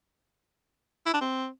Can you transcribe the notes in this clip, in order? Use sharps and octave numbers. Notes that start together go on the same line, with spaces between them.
E4
D4
C4